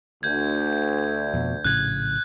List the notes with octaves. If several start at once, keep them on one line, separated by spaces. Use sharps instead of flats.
D2 G6 G#6
F2 B2
A#1 A2 C#3 F#6 G#6